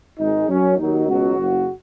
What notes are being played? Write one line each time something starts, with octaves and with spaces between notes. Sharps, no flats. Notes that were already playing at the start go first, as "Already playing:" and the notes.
G#1 G#2 G#3 D#4
F#2 F#3 C#4
D#2 D#3 F#3 D#4
C#2 B2 F#3 F#4
F#1 F#2 C#3